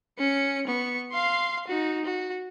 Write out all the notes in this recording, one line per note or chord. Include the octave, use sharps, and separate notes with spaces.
C#4 C#7
B3 C#6
F5 C6
D#4 F#4
F#4